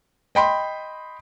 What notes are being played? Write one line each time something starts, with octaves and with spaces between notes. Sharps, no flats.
D#5 G5 B5 C6